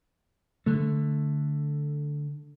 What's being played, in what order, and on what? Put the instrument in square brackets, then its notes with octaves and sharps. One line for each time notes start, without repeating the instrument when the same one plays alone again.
[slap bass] D3 A3